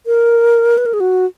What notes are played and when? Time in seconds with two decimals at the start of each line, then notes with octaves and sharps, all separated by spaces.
0.06 A#4
0.78 B4
0.86 A#4
0.93 G#4
1.00 F#4